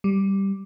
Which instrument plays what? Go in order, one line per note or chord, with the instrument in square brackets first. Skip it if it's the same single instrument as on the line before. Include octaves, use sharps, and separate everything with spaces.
[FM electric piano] G3